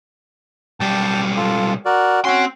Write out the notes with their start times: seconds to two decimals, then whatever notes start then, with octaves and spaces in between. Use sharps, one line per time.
0.80 B1 G3 G5 A5
1.37 F4 A4
1.86 F#4 A#4 D5
2.25 C4 C#4 F#4 C6